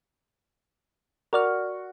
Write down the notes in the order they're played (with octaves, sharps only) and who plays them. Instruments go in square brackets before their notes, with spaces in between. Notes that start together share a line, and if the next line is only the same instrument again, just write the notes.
[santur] F#4 [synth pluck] A#4 D5 F6